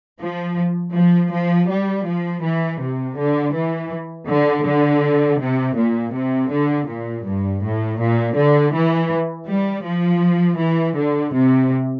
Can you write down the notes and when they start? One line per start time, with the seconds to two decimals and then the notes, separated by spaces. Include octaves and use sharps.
0.20 F3
0.94 F3
1.31 F3
1.68 G3
2.06 F3
2.43 E3
2.80 C3
3.17 D3
3.54 E3
4.28 D3
4.66 D3
5.39 C3
5.76 A#2
6.13 C3
6.50 D3
6.87 A#2
7.25 G2
7.62 A2
7.99 A#2
8.36 D3
8.73 E3
9.47 G3
9.85 F3
10.58 E3
10.95 D3
11.33 C3